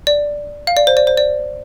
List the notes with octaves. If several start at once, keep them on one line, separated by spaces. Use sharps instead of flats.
D5
F5
D5
C5
D5
C5
D5